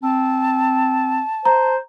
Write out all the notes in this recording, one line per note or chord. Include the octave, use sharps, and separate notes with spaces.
C4 A5
C5 A#5